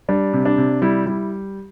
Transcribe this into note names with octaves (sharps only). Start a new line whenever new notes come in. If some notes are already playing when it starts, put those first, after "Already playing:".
G3 D4
C3
D4
C3
G3 E4
G3 E4